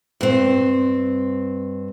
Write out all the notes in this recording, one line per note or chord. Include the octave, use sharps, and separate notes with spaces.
G2 C4